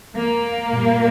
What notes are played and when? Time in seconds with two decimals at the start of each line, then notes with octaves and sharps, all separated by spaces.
0.13 A#3
0.69 A#2 G3